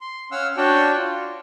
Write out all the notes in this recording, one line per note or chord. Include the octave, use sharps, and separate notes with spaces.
C6
C#4 F5 F#5 E6 F6
D4 F#4 C#5 D5 G5 A5
F4